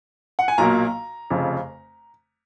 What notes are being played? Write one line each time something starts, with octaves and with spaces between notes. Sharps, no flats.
F#5
G#5
B1 A#2 F#3 A#3 A#5
F1 F2 C#3